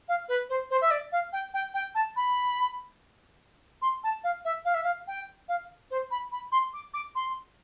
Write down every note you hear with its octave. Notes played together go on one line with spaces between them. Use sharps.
F5
B4
C5
C5
E5
D5
F5
G5
G5
G5
A5
B5
C6
A5
F5
E5
F5
E5
F5
G5
F5
C5
B5
B5
C6
D6
D6
C6